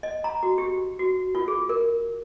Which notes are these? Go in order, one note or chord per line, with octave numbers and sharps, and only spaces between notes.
D#5
A#5
F#4
G4
F#4
F4
G#4
A#4